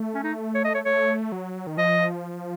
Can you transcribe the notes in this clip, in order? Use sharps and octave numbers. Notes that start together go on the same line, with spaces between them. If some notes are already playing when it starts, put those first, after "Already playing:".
Already playing: A3
C#4
D#4
C#5
D#5
C#5
A3 C#5
F#3
D#3
F3 D#5